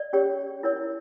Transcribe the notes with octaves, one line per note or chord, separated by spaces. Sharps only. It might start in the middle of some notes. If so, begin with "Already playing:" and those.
Already playing: D5
C#4 G4 C#5
E4 A#4 C#5